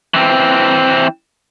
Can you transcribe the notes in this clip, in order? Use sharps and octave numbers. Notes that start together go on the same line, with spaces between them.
E3 C4